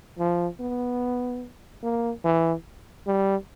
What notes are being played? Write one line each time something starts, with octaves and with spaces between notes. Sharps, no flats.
F3
B3
A#3
E3
G3